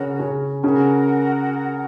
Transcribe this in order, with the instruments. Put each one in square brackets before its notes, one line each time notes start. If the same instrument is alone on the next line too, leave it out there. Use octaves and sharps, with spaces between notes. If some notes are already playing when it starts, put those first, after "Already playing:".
Already playing: [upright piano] C#3 C#4 [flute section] F#4 A#4 C#5
[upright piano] C#3 C#4
[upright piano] C#3 C#4 [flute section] F#4 A#4 F#5